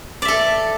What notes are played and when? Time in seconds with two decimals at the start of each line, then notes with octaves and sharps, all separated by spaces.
0.22 D5
0.25 E5
0.28 A4